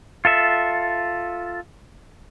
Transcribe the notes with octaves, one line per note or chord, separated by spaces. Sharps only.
F4 A4 E5